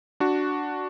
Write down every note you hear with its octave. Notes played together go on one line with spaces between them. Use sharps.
D4 F#4